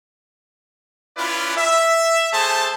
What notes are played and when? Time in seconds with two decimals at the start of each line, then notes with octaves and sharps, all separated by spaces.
1.16 C#4 E4 F4 B4 D5
1.56 E5
2.32 A3 G#4 C5 A5